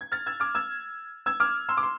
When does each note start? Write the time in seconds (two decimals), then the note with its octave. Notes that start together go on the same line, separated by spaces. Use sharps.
0.01 G#6
0.12 F6 A6
0.26 E6 G#6
0.40 D6 F6
0.55 E6 G#6
1.26 E6 G#6
1.40 D6 F6
1.69 C6 E6
1.77 D6
1.83 C6